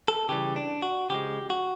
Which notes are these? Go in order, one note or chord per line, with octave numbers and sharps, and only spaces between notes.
A4
C#3 E3 G3 G4
D4
F#4
C#3 F3 G#3 G4
F#4